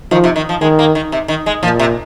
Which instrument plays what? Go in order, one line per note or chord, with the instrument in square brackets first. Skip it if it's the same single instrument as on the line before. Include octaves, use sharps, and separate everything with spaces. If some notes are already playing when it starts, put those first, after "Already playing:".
[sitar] D#3 [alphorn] F3
[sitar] C3
D#3
F3
[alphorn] D#3 [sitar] G#3
[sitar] A#3
D#3
C3
D#3
G#3
[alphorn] A#2 [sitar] F3
[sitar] C3